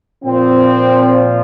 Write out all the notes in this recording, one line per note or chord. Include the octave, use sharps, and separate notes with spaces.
A#2 F3 C4